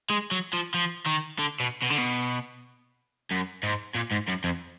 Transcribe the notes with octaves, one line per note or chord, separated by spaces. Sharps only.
G#3
F#3
F3
F3
D#3
D3
B2
B2
D3
B2
F#2
G#2
A#2
G#2
F#2
F2